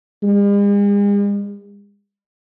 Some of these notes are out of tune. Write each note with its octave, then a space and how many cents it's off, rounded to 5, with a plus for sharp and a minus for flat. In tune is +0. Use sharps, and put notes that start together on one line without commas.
G#3 -45